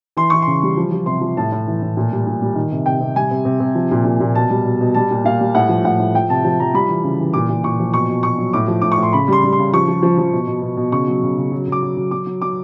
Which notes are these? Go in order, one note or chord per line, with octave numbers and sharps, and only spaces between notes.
E3 C6
E3 C#6
C#3 C6
G3
F3
F3
C3 C6
F3
A2 A5
A2
E3
A2
A#2
G3
A#2
G3
D#3
C3
C3 G5
C3
G3 G#5
C3
C3
C3
F3
A#2
A#2
A#2
B2 A5
G3
B2
B2
G3 A5
A#2
A#2 F5
G3
A2 F#5
F3
A2 F#5
A2
F3 G5
C3 A5
F3 A5
F3 A#5
G3 B5
E3
C#3
E3
A#2 D6
A#2
A#2 C#6
F3
B2 C#6
B2
B2 C#6
F#3
A2 D6
F3
A2 D6
C#6
A2 C6
C#3 B5
G3 C6
G3
C6
C#3
F3 C#6
F3
F3
F3
B2
B2
B2
B2
C#3 C#6
F#3
C#3
C#3
F#3
F#3 D6
F#3
F#3
F#3 D6
F#3
F#3 D6